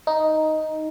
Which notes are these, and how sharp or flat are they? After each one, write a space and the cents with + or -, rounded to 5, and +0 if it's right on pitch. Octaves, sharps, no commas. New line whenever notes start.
D#4 +5